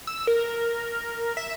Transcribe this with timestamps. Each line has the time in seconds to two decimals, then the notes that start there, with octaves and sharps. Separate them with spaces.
0.07 E6
0.27 A#4
1.37 E5